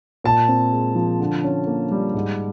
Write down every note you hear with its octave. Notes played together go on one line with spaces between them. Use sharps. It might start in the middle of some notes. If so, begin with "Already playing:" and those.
A#2 A5
C4
G#3
F3
D3
C#4
A#3
G3
G#2